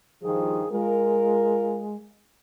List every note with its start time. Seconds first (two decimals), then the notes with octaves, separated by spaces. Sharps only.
0.22 G2 D#3 F3 G#4
0.72 G#3 F4 A#4